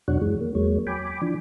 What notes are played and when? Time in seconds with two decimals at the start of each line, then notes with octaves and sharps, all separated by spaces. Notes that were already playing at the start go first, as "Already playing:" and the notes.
0.08 E2 B2 F#3 D4 C#5 F#5
0.21 F#2 E3 G#3
0.41 A#3
0.55 E2 F#3 G#3 A#3 C#5
0.87 G5 G#5 B5 D6
1.22 E3 F3 D4